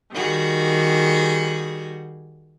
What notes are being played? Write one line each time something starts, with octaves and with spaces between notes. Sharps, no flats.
D#3 G3 F#4 G#4